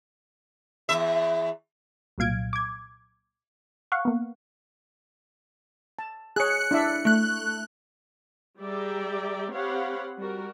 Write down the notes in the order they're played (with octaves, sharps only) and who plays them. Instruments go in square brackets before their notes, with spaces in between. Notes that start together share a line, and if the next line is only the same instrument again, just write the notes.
[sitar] E2 E5
[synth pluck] C2 A#2 F#3 F5 G#6 D7
D6 G#6
F5 F#5 C#6
A#3 B3
[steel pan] A5
[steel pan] G#4 C#5 [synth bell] F#6 C#7
[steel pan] D4 E4 E5
[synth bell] A3 F#6
[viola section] G3 G#4 D5 E5 G5 A#5
C4 G4 C#5 F5 F#5 B5
G3 F#4 A#4